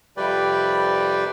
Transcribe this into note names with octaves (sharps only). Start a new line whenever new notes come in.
F2 C3 G3 B4 D5 G5